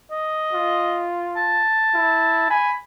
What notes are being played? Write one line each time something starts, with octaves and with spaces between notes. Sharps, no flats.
D#5
F4
A5
E4
G#5 B5